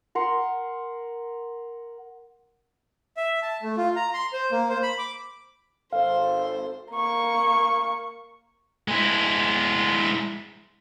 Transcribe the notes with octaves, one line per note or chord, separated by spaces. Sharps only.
A#4 F#5 C6
E5
A5
A3
F4
A#5
C6
C5
A#3
C5
B5
D6
G#1 A4 C5 F5
A#3 C#6
G#3 E4